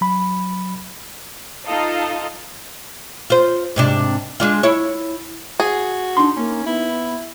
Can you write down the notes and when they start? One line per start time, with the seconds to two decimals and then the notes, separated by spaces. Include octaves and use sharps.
0.01 F#3 B5
1.66 D#4 F4 A4 D#5 F5
3.30 F4 C5
3.76 G#2 C3 D4
4.40 G#3 D4 F4
4.63 E4 C#5
5.60 F#4 G#4
6.17 D4 D#4 C6
6.37 A#3 C#4
6.66 B3 E4